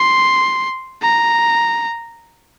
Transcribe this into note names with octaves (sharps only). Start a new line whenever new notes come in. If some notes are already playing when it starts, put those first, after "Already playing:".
Already playing: C6
A#5